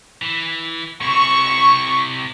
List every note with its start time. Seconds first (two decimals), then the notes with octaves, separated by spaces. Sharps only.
0.22 E3
1.01 C3 E4 C#6